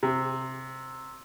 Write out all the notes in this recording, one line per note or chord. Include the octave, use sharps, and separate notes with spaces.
C3